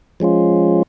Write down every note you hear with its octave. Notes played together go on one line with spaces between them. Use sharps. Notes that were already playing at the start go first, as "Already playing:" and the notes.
F3 G#3 C#4 F4